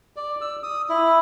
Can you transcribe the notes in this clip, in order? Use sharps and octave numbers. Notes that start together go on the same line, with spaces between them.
D5
E6
D#6
E4